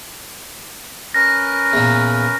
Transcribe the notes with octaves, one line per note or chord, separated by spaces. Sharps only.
C#4 A#4 B4 A#6
E2 A#2